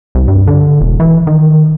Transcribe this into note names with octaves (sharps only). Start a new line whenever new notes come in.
C2
G2
D3
E1
E3
D#3